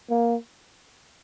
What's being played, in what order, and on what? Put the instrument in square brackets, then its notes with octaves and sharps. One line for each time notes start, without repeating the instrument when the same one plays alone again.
[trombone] A#3